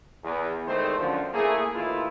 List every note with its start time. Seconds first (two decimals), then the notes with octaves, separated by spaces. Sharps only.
0.24 E2
0.68 E2 D#3 G#3 A3 C4 C5
0.99 F#2 D3 F3
1.34 A3 A#3 E4 G#4
1.75 D#2 A2 E3 E4 F4